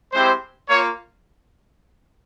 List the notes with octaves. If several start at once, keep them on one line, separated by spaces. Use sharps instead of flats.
G#3 C4 E4 G4 C5
A#3 F4 C#5